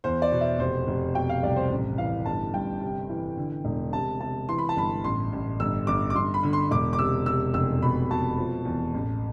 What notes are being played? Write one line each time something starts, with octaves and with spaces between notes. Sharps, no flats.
E2 C5
D5
B2
E5
F1 C5
F1
B2 G5
F5
C2 D5
C5
A1
E3 F5
G1 A5
G2 G5
C3
E3
D3
E1
C3 A5
C3 A5
E3 C6
B5
A5
G1 B5
A1 C6
A1
G1 E6
G1 D6
D6
G1 C6
B5
D3
C6
E1 D6
D6
C3 E6
C3 E6
F1 E6
B2 B5
B2 A5
F3
E2
A1